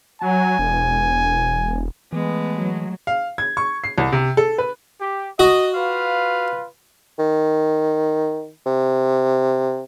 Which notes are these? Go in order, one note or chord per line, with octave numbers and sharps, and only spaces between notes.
F#3 G#5
E1
E3 G#3 A3 B3
F#3
F5
G#6
C#6
C7
C2
C3
A4
B4
G4
F#4 D#5
F4 B4 F5
D#3
C3